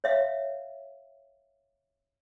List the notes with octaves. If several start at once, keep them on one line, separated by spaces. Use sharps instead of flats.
C#5 E5 F5